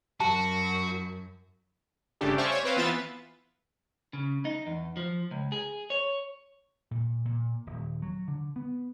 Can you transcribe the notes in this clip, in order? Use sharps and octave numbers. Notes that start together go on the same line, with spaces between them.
F#2 F#4 A5
G1 C#3 A3 D4 G4
C5 D5 E5 F5 G#5 C#6
C#5
C4 B4 C5 F5
E3 B3 F4 B4 E5 A6
C#3
D#4
E2
F3
C#2
G#4
C#5
A#2
A#2
D#1
F#3
D3
B3